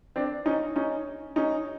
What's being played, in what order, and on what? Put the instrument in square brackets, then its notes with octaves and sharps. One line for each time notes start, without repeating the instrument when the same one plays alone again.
[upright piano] C4 D4
C#4 D#4
C#4 D#4
C#4 D#4